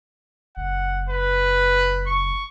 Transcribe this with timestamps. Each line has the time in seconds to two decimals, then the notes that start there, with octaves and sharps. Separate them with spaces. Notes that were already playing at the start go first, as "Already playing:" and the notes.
0.57 F#1 F#5
1.09 B4
2.07 C#6